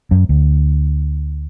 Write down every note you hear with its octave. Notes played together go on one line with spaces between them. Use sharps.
F#2
D2